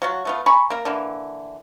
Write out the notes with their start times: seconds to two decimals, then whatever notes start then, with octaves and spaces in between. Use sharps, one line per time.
0.02 F#3 F4 F#4
0.25 A3 B3 F4
0.46 G#5 A#5 B5 C#6
0.70 A#3 A#4
0.85 D3 E3 A#3